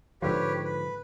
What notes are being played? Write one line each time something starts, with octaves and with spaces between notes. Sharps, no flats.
G#2 D3 F3 G4 B4 C#5
B4